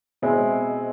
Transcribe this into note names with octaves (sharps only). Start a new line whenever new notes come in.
B2 G#3 C4 E4